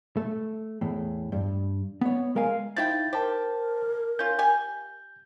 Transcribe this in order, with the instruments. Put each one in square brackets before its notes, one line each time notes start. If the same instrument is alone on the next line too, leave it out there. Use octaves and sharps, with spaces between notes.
[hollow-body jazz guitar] A3
E2 A2
G2
B3 C#5
G#3 A#4 F5 G#5
[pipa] F3 E4 G5 [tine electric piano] D#4 A6
[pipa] G4 [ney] A#4 [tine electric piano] C5 A5
[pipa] C#4 F4 [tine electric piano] G6
[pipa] G4 G#5